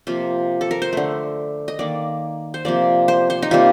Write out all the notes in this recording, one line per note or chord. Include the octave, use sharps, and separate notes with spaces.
C3 F3 A#3 F4
A4
A#4
C5
D3 A3
D#5
D#3 A#3 D5
C5
C3 F3 A#3 D5
C5
C5
D#4
C3 G3 A#3 F4